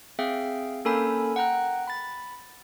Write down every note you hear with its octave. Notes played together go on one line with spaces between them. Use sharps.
C4 G#4 E5 F5 G5
A#3 C#4 A4 A#4 G#5 B5
F#5 G5 A#5 F#6
B5 A6